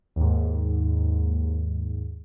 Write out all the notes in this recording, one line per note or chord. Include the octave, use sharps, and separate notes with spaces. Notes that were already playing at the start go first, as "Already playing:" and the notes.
D#2 G#2